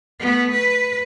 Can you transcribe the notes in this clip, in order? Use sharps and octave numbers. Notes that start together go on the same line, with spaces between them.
A3 B3
B4